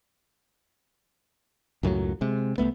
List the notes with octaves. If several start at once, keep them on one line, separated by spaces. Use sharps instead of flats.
C#2 F#2 A2 F#3
C3 G#3
C2 A2 A3 B3